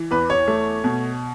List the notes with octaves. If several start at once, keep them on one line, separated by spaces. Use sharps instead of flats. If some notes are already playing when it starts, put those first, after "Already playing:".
Already playing: E3
E2 B4
C#5
A3
B2